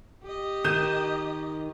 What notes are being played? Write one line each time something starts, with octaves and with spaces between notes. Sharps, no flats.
G4 D#5
D#3 G6 D#7 E7